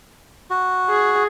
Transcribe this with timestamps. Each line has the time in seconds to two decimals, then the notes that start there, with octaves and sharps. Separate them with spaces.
0.50 F#4
0.90 G#4